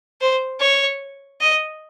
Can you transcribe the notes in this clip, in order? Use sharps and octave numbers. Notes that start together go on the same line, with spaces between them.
C5
C#5
D#5